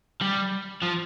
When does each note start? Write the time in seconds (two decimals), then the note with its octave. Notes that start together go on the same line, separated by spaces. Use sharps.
0.21 G3
0.83 F3